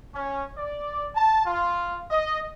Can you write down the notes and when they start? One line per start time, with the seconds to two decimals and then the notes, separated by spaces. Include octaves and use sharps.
0.15 C#4
0.57 D5
1.15 A5
1.45 F4
2.10 D#5